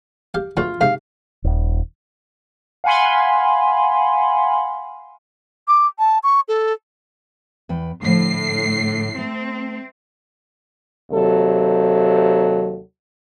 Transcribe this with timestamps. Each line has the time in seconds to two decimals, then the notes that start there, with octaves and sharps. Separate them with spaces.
0.34 G4 F5
0.57 E2 A2 F4 F#4
0.81 G#2 C3 F5
1.44 D#1
2.84 F5 F#5 G#5 B5 C6
5.68 D6
5.99 A5
6.23 C#6
6.48 A4
7.69 E2 B4 G5
8.03 A2 D3 F3 C7
9.18 A3 C4
11.11 D#2 C3 F#3 A4